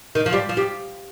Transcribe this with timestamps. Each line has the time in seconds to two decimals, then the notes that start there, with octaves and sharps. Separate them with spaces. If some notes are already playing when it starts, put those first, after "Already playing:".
0.15 D#3
0.26 F3
0.33 G3
0.49 F3
0.57 G3